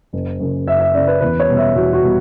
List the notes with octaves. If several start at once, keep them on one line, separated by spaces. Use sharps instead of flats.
F#1
F#2 C#3
F#1 E5
E5
F#2 C#3 D5
B4
E2 B4
C#5
B2 G3
E5
E2 F#4
F#4
B2 G3